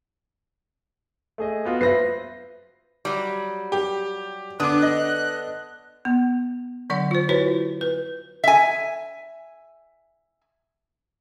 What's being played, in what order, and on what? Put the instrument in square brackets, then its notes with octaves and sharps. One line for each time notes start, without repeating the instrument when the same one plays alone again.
[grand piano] A3 G#4 D#5
B3 F4 F#4
[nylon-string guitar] B4 C5 E5 [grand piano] A#6 C7
[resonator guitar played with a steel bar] F#3 G3
[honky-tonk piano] G4
[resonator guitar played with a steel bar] D3 B3 D4 [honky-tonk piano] D6 D#6 [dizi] F#6
[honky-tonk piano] D#5
[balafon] B3
D3 F#3 D5 F#5
F4 C5
E4 F#4 B4 C#5
B4
[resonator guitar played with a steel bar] E5 G#5